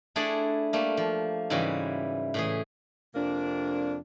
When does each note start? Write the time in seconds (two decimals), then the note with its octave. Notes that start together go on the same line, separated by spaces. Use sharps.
0.16 A3 D4 E4 G#4 D5 F#5
0.73 G3 A3 A#3
0.97 F3
1.50 G#2 C#3 E3 G3 E4 F#4
2.34 A2 E3 G#4
3.15 F2 C3 A#3 D4